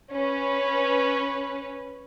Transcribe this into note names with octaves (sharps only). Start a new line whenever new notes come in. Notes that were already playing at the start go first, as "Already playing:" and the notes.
C#4 B4